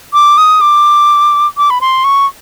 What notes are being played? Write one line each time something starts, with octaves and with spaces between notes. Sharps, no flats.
D6
D#6
D6
D6
B5
C6
C#6